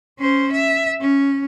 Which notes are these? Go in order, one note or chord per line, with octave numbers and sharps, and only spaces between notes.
C#4 C5
E5
C#4